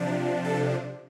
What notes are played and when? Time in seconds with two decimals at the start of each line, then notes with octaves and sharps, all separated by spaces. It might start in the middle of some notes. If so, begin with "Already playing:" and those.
Already playing: C3 F3 D4
0.44 A4